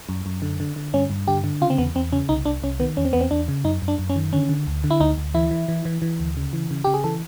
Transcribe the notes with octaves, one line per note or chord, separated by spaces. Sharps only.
F#2
F#2
D3
D3
D3
G2 C#4
G2
D3 G4
D3
C#3 F4
C4
E2 B3
E2 C4
C#3 C#4
C2 D#4
C2 D4
C2 C#4
D#3 B3
E2 C#4
C4
E2 B3
C4
E2 D4
C#3
F#2 D#4
F#2
D4
F#2
C#4
D#3
D3 C#4
D3
D2
D3
E4
D2 D#4
D2
E3 E4
E3
E3
E3
E3
D2
C#3
E3
C#3
C#3 G4
G#4
E3 A4